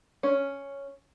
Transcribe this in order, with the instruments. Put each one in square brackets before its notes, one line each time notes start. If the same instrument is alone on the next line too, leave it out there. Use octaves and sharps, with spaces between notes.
[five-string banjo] C#4